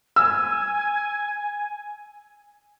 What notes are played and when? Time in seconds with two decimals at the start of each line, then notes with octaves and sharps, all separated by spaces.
0.16 G#5 E6